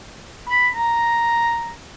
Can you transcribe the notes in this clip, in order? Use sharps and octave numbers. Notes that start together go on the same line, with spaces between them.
B5
A#5